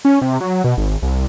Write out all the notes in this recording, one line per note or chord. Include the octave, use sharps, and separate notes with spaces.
C#4
C3
F#3
B2
G#1
C2